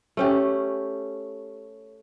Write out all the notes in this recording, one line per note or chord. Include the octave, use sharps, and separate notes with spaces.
A3 C#4 G4